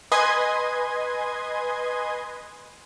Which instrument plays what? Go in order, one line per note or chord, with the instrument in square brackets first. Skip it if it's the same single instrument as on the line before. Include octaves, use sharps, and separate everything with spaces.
[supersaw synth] B4 D#5 G#5 C6 D#6 G#6